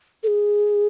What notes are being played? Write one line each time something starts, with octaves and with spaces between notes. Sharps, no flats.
A4
G#4